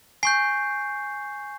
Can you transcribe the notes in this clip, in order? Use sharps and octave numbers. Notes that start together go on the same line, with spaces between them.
G#5 C#6 G6 C7